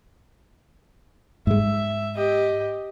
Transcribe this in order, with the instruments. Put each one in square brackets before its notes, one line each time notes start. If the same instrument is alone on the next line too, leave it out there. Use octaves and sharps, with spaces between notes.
[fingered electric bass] G#2 G#3 [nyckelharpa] E5
[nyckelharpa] G4 D#5